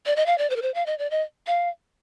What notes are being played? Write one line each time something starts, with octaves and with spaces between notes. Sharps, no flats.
D5
D#5
F5
D5
C5
A#4
C5
F5
D#5
D5
D#5
F5